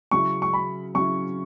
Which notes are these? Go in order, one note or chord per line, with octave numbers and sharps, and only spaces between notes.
C#3 F#3 C#4 E4 C#6
C#6
B5
C#3 F#3 C#4 E4 C#6